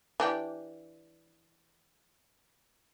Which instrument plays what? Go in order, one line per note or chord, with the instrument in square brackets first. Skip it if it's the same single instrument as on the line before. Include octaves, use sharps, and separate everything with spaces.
[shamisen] E3 D4 G4